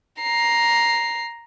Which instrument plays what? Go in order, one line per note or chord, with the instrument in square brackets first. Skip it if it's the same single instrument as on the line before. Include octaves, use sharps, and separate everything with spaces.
[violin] A#5 C7